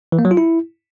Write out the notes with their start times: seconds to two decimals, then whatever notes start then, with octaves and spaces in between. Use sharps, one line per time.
0.12 E3
0.19 A#3
0.25 F#3
0.31 F4
0.37 E4